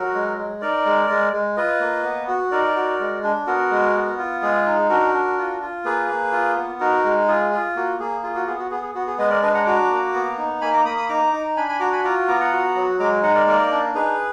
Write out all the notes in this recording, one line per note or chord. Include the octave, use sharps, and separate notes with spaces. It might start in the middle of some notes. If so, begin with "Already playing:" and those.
Already playing: F#3 F#4 A#4
G#3
G#3
D#4 A#4 D5
G#3
G#3
G#3
F4 B4 D#5
A#3
B3
F#4
D#4 A#4 D5
F#4
G#3
D4
B3 F#4 A#4
G#3
B3
F4
G#3 G#4
D#4
D4 F#4 A#4
D4
F4
F4
A#3 G#4 B4
A#3
F4
B3
D#4 F#4 A#4
G#3
F4 G#4
F4
A#3 F#4
A#3 G#4
F4 G#4
F#4
B3 G#4
F#4
B3 G#4
G#4
B3 F#4
G#4
G#3 B4 D#5
A#4 D5
D4 B4 D#5
F#5 A#5
F#4 A#5 D6
A#3
B3
D#4
A#3 G#5 B5
A#5 D6
A#3 B5 D#6
B5 D#6
D#4 A#5 D6
D#4
D4 G#5 B5
G#5 B5
F#4 A#5 D6
G#5 B5
F4 A#5 D6
B3 A#5 D6
F#5 A#5
F#4
F#3
G#3 A#5 D6
D#4 F#5 A#5
A#4 D5
A#3 A#4 D5
D4
D#4 G#4 B4